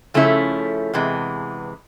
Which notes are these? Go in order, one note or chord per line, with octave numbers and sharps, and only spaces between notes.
C#3 F3 A3 C#4 E4
E2 C3 E3 G#3